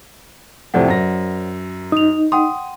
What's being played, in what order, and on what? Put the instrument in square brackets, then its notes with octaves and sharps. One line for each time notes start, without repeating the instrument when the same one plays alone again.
[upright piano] F2 A2 C3 [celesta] C5 D5 F#5
[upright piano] F#2 A#6
[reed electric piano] D#4 [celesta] D#6 F7
[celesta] F#5 G5 C6 [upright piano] D#6